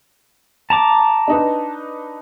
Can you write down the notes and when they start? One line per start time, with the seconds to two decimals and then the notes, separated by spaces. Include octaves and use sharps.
0.70 A5 A#5 D6
1.28 D4 D#4 B4